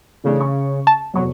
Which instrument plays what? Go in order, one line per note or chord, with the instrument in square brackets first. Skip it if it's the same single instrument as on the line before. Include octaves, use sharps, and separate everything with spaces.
[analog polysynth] C#3 [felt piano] E3 A3 D4
[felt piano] C#6
[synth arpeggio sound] A5
[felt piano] F1 E2 C#6 [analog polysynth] F#3